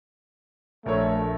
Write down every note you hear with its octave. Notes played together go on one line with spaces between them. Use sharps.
A#1 A3 A#4 C#5